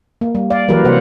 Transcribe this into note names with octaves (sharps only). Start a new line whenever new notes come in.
A#3
G3
D5 F5
E3 F#3 A#3 G4 A#4 B4
C3 A#3 C5 F#5